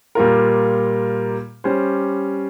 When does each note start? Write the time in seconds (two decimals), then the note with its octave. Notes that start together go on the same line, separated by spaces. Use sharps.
0.15 A#2 G3 A#3 F4 A#4
1.64 G3 C#4 G4 C5